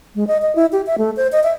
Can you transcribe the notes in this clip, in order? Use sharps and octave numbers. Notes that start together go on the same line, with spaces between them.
G#3
D#5
D#5
E4
G4
E5
A3
C5
D#5
E5